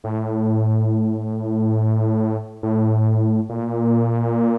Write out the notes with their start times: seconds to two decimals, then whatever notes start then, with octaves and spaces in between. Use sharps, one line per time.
0.04 A2
2.63 A2
3.49 A#2